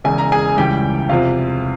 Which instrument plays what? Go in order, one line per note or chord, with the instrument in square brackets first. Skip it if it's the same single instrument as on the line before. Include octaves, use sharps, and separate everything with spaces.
[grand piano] E1 E2 C#3 G#5
A#5
G#4 G#5
C#2 C#3 E3 G3 G4 G5
E2 C3 F3 F4 F5